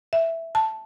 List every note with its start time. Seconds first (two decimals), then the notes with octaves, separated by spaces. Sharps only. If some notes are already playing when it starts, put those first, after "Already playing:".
0.13 E5
0.55 A5